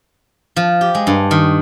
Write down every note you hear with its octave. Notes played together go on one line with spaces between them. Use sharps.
F3
G4
G#3
G2
D#3